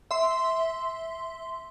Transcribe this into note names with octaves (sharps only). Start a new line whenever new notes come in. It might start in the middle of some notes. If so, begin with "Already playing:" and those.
E5 C6